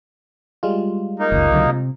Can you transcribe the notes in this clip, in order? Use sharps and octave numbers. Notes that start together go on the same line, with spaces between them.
G3 G#3 F4
A#3 D#4
F#1 C#2
C2 D3 F#3
C3